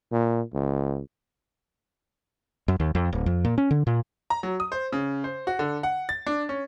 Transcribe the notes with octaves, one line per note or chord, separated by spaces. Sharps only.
A#2
C#2
F#2
D#2
F2
D1
F2
A#2
C#4
D3
A#2
A#5
F#3
D#6
C5
C#3
C5
F#4
D3
F#5
A6
D4
C#4